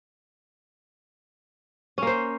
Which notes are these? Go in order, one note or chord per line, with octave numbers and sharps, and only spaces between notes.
A#3 C#4 C5